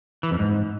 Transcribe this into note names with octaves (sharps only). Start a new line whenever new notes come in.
E3
F2
G#2